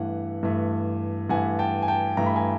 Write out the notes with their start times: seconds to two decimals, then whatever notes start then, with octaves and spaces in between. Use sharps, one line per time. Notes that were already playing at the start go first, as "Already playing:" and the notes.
Already playing: G2 E3 A3 F#5
0.43 G2 E3 A3
1.29 G2 E3 A3 F#5 G#5
1.59 G5 A5
1.82 G#5
1.88 G5 A5
2.17 G2 E3 A3 A#5
2.26 B5
2.36 G#5 A#5